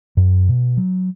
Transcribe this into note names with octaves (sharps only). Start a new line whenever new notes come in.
F#2
B2
F#3